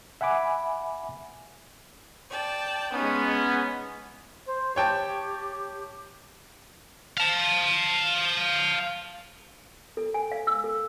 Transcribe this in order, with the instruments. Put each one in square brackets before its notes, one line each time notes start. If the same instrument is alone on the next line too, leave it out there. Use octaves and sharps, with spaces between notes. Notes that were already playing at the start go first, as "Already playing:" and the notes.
[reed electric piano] E5 F#5 G#5 B5 D6
[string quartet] D5 G5 A5
[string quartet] G#3 D#4 [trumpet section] B3 C#4
[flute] C5
[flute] G4 [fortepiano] C#5 G5 A5
[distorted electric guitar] F5 A5
[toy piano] A4
G#5
F5
E6
A4